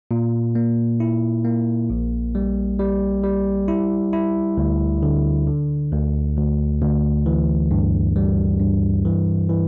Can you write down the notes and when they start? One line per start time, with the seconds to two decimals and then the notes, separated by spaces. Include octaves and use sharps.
0.11 A#2
0.55 A#3
1.00 E4
1.45 A#3
1.90 A#1
2.35 G3
2.79 G3
3.24 G3
3.68 E4
4.13 E4
4.58 D2
5.03 D3
5.47 D3
5.92 D2
6.37 D2
6.82 D2
7.26 E3
7.71 G2
8.16 G3
8.60 G2
9.05 E3
9.49 E3